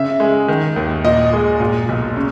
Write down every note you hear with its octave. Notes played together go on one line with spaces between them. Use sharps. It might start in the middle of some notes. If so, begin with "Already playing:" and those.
Already playing: C#3 E5
G#3
D#3
D#2
A#2 D#5
G#3
A#2
B1
C#3